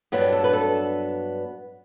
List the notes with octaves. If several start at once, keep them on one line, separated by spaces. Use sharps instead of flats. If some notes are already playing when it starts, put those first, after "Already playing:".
G2 F#3 B3 D4 G4
A4
B4
A4